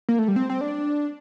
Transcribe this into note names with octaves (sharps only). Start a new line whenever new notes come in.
A#3
A3
G3
C4
C4
D4